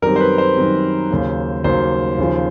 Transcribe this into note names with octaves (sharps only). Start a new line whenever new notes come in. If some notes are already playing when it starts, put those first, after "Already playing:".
F#2 D#3 G3 C4 A#4
C5
B4
C5
F#2 D#3 G3 C4
D#2 C#3 F#3 A#3
D#2 C#3 F#3 A#3 C5
D#2 C#3 F3